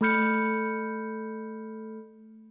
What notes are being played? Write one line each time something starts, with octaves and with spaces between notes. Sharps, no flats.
A3 A4 B5 F6 G6 C#7